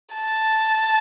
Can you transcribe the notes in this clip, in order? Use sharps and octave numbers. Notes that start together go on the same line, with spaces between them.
A5